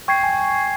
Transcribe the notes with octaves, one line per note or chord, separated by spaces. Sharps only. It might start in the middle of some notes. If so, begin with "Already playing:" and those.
G5 C#6 G#6 C7
G#5